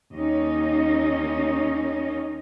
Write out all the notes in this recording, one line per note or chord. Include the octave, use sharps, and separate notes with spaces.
D#2 C#4 D#4 D#5